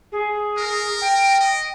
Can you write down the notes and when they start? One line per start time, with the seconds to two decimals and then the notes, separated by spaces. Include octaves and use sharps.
0.12 G#4
0.58 A#4
1.02 G5
1.41 D#5